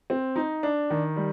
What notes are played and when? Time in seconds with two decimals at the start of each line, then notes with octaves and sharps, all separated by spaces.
0.10 C4
0.36 D#4
0.63 D4
0.90 D#3
1.16 G3